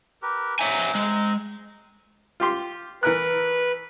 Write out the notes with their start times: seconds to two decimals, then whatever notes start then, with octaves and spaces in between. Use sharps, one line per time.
0.22 G4 A#4 B4
0.59 C4 D#4 C#5 E5 G#5 A#5
0.95 G#3
2.40 F4 G4 C6
3.03 E3 A#4 B4 F#6